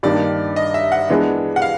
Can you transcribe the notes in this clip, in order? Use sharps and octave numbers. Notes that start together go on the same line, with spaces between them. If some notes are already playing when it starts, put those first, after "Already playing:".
G2 D#3 G3 A#3 D4 D5
D#5
E5
F#5
E3 G#3 B3 D4
F#5
F5